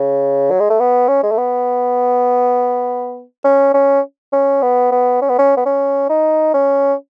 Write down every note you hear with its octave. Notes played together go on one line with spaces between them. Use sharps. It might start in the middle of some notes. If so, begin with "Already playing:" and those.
Already playing: C#3
F#3
G#3
A3
B3
C#4
G#3
A3
B3
C#4
C#4
C#4
B3
B3
C#4
B3
C#4
B3
C#4
D#4
C#4